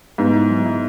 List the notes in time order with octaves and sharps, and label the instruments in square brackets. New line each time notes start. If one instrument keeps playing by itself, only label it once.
[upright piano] G#2 [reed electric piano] B3
[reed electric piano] E4
F#3
E4